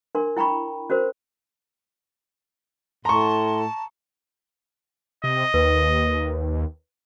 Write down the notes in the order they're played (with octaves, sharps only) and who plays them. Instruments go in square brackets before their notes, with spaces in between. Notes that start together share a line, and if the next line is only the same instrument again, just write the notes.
[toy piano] D4 A#4 C6
E4 G5 A#5 B5 C#6
C#4 F#4 A#4 C5
[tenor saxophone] A2 [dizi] A5 [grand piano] A#5 C#6 [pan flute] C6
[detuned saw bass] C3 [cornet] D#5
[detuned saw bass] D#2 [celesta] B4